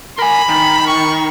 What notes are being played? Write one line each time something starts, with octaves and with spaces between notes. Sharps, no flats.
A#4 G#5 B5
D#3
C#6